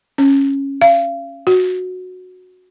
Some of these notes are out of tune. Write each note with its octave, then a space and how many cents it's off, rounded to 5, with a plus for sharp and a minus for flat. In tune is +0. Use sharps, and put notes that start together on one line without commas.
C#4 -10
F5 -35
F#4 -10